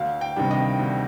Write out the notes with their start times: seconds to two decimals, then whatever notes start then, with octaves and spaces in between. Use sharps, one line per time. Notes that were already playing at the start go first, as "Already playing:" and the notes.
Already playing: D2 F5
0.21 G5
0.36 C3 D#3 G3 D4
0.51 D#5
0.79 D2